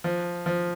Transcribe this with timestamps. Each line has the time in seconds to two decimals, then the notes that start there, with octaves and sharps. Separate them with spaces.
0.04 F3
0.46 F3